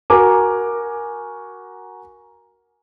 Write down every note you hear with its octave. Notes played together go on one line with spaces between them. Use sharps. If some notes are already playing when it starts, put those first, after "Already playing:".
F#4 A#4 G#5 A#5 D6